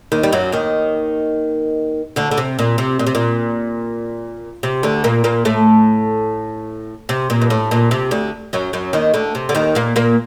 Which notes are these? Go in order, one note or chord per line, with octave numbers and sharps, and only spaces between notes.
D#2 D#3
G3
F#2 F#3
D#2 D#3
D2 D3
D3
C3
A#2
C3
A#2
C3
A#2
C3
D2 D3
A#2 A#3
A#2 A#3
A2 A3
C3
A#2
G2
A2
A#2
C3
D2 D3
F#2 F#3
F#2 F#3
D#2 D#3
D2 D3
C3
D3
D#2 D#3
A#2 A#3
A#2 A#3